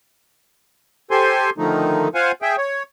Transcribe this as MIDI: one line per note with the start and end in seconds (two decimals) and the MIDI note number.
1.11 1.50 67
1.11 1.50 69
1.11 1.50 72
1.11 1.50 80
1.11 1.50 84
1.58 2.08 50
1.58 2.08 51
1.58 2.08 53
1.58 2.08 57
1.58 2.08 63
2.15 2.32 65
2.15 2.32 72
2.15 2.32 77
2.15 2.32 78
2.15 2.32 80
2.42 2.56 68
2.42 2.56 76
2.42 2.56 79
2.58 2.83 73